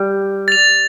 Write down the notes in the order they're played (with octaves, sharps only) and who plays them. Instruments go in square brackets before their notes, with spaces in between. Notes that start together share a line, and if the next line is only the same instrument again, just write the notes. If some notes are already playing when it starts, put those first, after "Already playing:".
Already playing: [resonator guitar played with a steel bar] G3
[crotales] A6 F7